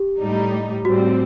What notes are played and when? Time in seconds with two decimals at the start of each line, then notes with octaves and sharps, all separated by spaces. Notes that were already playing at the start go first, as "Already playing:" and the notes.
Already playing: G4
0.20 A2 G3 D#4
0.84 A2 G3 C4 F#4